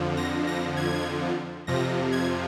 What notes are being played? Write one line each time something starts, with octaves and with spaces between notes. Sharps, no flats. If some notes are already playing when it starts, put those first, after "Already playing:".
Already playing: F2 D3 F3
A#6
A#6
G#6
F2 C3 F3 A#6
G#6